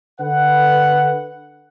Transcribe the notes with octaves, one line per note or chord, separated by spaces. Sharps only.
D3 B4 F#5